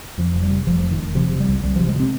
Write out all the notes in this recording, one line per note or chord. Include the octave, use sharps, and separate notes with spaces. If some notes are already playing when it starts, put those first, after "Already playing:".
F2 F3
F1
G3
C3
F1 F3
F2
D#3
F1
C3 F3
C3
G3
C2
C2 G3
F3
C3
G#3
C3 C4